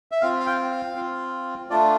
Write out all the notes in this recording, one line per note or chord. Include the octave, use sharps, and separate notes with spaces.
E5
C4 F4 F5
F5
G5
F5
C4 F4
A3 D4 F4 D5